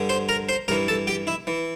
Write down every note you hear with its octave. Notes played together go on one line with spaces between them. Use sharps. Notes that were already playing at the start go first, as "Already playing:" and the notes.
Already playing: G2 D3
C5 C6
A#4 A#5
C5 C6
G2 E3 A#4 A#5
A4 A5
G4 G5
E4 E5
E3